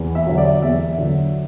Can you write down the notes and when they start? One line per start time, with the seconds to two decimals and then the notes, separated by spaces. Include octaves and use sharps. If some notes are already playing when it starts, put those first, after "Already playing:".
Already playing: E2
0.15 E5
0.27 D3 F#3
0.38 D5
0.62 E2 E5
0.98 D3 F#3